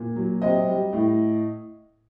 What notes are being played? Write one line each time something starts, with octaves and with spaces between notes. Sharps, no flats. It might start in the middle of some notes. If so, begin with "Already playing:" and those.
Already playing: A#2
F#3
C3 D#5
G3
A2